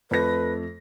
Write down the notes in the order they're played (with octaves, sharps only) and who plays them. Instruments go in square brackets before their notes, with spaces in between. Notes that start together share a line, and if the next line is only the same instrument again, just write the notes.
[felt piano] F2 A3 A#6 [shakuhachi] B4